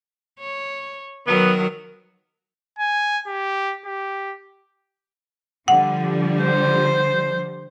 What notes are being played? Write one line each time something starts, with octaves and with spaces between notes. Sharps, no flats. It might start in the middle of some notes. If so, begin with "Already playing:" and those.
C#5
D#3 F#3 B3 A#4
G#5
G4
G4
D3 F3 G3 F#5
C5